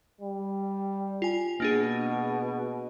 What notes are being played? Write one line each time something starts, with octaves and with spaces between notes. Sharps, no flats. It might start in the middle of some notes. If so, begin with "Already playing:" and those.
G3
F4 G#5
B2 A#3 D4 G#4